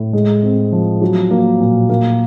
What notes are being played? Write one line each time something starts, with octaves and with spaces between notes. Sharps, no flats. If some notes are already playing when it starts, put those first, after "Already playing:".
Already playing: A2
G#3
C4
F3
F#3
A#3
A#2
A#3